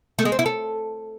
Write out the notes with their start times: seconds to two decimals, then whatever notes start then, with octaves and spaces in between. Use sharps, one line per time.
0.19 A3
0.25 G#3
0.32 C4
0.39 E4
0.46 A4